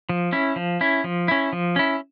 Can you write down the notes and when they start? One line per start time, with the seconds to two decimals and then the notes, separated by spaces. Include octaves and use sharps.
0.09 F3
0.32 C#4 E4
0.56 F3
0.81 C#4 E4
1.04 F3
1.28 C#4 E4
1.53 F3
1.76 C#4 E4